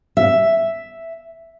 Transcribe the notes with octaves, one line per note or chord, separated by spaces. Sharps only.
E5